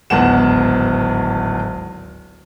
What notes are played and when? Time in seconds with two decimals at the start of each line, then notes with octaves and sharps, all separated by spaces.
0.10 D1 G#1 B3 F#5 E7